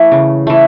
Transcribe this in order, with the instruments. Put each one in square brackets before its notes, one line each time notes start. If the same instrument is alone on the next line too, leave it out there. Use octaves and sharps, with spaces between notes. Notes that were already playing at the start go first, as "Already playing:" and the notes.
Already playing: [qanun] E3 A3
C#3
E3 A3